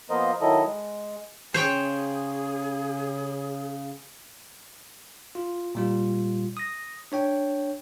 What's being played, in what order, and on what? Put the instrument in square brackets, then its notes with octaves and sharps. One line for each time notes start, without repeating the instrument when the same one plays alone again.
[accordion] F3 A#3 B3 A#4 C5 D#5
D#3 F#3 E4 A4 D#5
G#3
[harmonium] C#3 [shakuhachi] G#4 [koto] C5 C#5 G5
[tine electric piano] F4
A#2 G3 F4
D#6 A#6
D4 C#5 G5